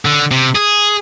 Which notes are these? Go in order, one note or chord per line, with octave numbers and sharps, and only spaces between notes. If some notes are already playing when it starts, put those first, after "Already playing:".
D3
C3
G#4